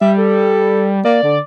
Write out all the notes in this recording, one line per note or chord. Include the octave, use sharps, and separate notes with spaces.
G3 E5
A4
A#3 D5
D3